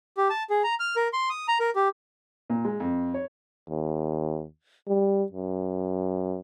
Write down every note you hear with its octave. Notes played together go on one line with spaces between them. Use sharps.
G4
A5
G#4
A#5
F6
A#4
C6
D#6
A#5
A#4
G4
A#2
G#3
F2
C#5
D#2
G3
F#2